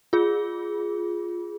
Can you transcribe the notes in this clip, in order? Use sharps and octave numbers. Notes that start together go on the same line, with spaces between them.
F4 G#4